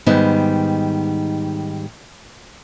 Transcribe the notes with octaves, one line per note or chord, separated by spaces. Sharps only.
G#2 D#3 G3 B3 D#4